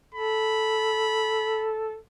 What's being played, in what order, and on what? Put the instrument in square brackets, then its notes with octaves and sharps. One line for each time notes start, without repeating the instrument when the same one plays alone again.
[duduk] A4 [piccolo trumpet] B5